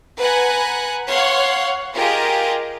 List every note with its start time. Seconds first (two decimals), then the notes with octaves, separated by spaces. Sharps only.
0.18 B4 F#5 G#5 A#5 F#6
1.11 C#5 F5 F#5 C6
1.95 F4 G4 G#4 A#4 D#5